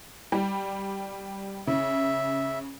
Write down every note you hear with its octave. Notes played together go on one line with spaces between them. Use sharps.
G3
C#3 E5